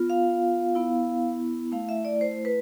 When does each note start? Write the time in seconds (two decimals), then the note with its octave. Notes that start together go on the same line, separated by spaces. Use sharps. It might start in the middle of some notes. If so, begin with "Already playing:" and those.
Already playing: B3 F4
0.10 F5
0.75 B3 E4
1.72 A3 E4 F5
1.89 E5
2.05 D5
2.21 C5
2.45 B4